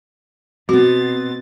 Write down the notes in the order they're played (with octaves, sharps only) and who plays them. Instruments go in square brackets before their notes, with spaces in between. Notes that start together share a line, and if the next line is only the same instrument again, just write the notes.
[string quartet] B2 A6 [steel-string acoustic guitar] B3 C4 [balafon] F#4